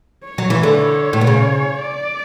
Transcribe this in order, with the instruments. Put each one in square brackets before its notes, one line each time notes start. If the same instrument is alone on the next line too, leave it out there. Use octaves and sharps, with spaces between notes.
[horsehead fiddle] C#5
[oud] F#3
E3
D3
[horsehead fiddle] C#5
[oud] A2
B2
C#3
[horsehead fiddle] D5